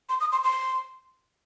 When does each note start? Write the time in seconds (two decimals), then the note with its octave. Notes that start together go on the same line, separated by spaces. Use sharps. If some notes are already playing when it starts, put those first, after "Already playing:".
0.09 C6
0.20 D#6
0.32 C6
0.44 C6